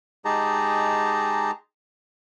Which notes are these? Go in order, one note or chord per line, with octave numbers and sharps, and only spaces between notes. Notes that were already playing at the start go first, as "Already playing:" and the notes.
G#3 D#4 G4 G#4 A5 A#5